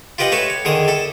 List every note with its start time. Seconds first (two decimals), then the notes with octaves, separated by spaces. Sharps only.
0.18 F4 G4 B4 D#5 F#5
0.32 A3 B4 C#5 E5 G#5
0.50 C#5
0.65 E2 D3 D#3 G#4 D#6
0.88 A4 E5